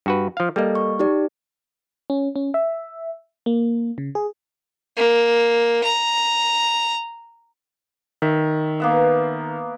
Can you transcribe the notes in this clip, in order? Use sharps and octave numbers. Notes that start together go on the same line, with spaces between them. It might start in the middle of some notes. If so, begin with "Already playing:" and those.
G2 F#4 B4
F3 F5
G3 A#3 A4 D#5
C#6
D#4 G4 D5
C#4
C#4
E5
A#3
C#3
G#4
A#3
A#5
D#3 E5
A#3 B3 E5